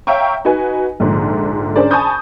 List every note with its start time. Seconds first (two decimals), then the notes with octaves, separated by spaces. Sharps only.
0.07 C#5 E5 F5 G5 A#5 C#6
0.45 D#4 F#4 B4 G#5
1.00 A#1 G#2 D3
1.76 C#4 D4 G#4 A#4 C5 D5
1.91 G#5 A5 B5 C#6 D#6 G6